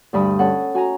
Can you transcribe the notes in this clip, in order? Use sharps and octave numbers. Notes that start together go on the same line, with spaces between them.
D2 G2 B5 D#6
C#4 A4 F#5
F#4 G#5 A#5